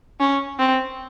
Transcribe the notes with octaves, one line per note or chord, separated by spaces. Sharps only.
C#4
C4